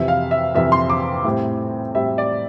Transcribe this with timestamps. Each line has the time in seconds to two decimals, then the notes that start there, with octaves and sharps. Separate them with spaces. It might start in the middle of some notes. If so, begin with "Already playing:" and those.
Already playing: F2 C3 E3 E5
0.08 F5
0.31 E5
0.55 F2 C3 E3 E5
0.72 C6
0.90 D6
1.25 A2 G3 C4
1.95 A2 G3 C4 E5
2.18 D5